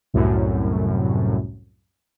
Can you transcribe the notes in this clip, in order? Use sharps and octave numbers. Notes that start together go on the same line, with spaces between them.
C2 F#2 A2